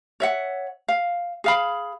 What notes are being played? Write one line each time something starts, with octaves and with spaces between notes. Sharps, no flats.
C#5 E5 F#5
F5
G#4 F5 B5